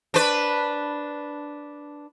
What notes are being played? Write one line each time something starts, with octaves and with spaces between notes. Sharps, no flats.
D4 B4